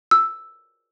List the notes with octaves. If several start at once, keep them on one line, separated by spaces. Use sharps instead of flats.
E6